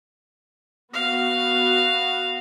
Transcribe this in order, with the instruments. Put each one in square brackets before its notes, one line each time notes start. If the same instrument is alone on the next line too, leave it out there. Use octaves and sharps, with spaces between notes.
[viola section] B3 F#4 [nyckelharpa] F5